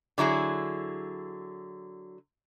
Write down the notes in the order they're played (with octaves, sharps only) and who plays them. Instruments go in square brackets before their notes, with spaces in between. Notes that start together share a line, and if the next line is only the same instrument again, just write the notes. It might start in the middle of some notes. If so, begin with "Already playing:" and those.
[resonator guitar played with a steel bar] D3 F#3 E4 G#4